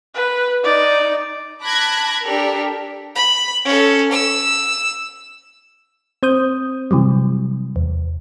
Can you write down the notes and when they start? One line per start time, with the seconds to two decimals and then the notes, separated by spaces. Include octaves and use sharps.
0.15 B4
0.64 D#4 D5
1.63 A5 B5 D6 F#6 G#6 A#6
2.24 D4 G4 A4 A#4
3.16 B5
3.65 C#4 A4
4.11 E6
6.23 C4 C5 D#6 G6
6.91 C3 E3 F#3 G3
7.76 E2